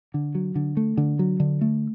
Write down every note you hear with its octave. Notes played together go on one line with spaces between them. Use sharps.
D3
F#3
D3
A3
D3
F#3
D3
A3